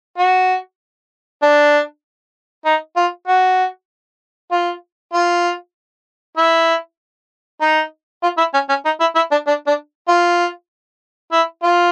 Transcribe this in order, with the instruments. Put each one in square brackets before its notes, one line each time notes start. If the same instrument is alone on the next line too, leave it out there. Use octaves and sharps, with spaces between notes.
[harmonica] F#4
D4
D#4
F4
F#4
F4
F4
E4
D#4
F4
E4
C#4
C#4
D#4
E4
E4
D4
D4
D4
F4
E4
F4